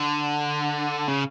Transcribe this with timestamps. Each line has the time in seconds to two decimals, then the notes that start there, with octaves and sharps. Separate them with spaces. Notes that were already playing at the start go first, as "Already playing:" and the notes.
Already playing: D3
1.08 C#3